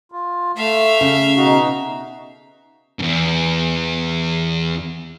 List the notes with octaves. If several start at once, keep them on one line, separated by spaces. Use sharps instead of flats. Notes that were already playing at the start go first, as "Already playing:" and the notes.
F4
A3 E5 F5
C#3
B2 D#4 F#4
E2 G2